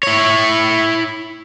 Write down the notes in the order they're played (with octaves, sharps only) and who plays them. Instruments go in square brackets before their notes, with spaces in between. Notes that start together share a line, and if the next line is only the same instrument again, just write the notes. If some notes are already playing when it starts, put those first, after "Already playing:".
[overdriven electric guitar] E4 C#5